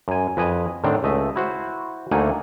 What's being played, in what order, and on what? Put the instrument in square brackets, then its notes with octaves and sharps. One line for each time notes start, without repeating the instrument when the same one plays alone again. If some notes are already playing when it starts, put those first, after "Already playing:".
[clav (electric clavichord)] F#2 G#5
F2 B4 D#5 G#5
A2 D3 D#3 C4 D4
C#2 A3 D#5 E5
E4 F#4 C5
D2 A3 A#3 D#4 F#5 G#5